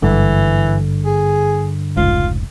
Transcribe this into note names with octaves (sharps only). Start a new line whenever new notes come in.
G#1 G2 D3 E3
G#4
F1 C#2 G#2 F4